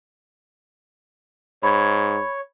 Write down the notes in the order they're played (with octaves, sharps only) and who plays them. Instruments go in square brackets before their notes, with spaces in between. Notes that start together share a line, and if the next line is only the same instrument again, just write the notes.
[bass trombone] G#2 [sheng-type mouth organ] C#5 [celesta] B5 G#6